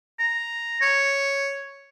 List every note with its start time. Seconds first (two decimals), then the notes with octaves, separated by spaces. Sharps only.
0.19 A#5
0.82 C#5